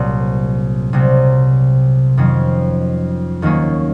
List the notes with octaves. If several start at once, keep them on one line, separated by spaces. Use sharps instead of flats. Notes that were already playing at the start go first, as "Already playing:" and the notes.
Already playing: C2 A#2 F#3
C2 C3 F#3
F2 D#3 F#3 C#4
D#2 D#3 F#3 A#3 C#4